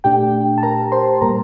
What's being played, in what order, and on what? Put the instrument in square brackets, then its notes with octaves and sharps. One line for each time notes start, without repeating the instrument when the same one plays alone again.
[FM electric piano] A#2 A3 D4 G4 G5
A5
A#4 A#5
C5 C6
A#2 G3 A#3 A#4 A#5